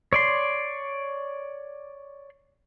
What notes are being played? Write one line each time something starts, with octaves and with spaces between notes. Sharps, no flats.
C#5 D5 C6